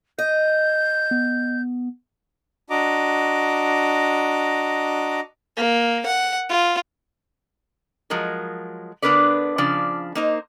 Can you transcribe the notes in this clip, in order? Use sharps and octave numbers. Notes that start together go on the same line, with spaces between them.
D#5 G6
B3
D4 F#4 D#5 A#5 D6
A#3
F#5
F4
F3 F#3 G#3 A#4
D3 B3 D4 A#4 B4 D5
C#3 F3 D4 D5
A#3 D#4 C5